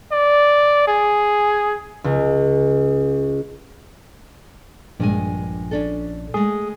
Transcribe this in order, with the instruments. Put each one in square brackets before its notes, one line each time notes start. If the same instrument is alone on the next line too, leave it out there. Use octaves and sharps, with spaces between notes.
[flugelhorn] D5
G#4
[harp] C#2
[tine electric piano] A#1 [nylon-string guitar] G2 G#3 G#5
[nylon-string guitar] C#4 D4 A4
[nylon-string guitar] G#3 A3 [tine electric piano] G#4